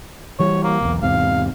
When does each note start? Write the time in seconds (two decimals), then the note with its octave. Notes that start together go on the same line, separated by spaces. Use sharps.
0.40 E3 G3 C#5
0.64 A#3
0.81 B1 E2
1.02 E2 G#2 C3 F5